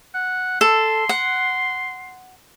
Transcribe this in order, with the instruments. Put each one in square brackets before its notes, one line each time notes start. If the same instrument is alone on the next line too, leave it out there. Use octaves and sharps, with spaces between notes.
[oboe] F#5
[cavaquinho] A4 [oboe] C6
[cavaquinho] F#5